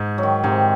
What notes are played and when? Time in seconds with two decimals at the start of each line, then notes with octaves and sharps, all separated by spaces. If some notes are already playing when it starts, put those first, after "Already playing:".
Already playing: G#2
0.18 F#3
0.23 D#3
0.44 G#2 C3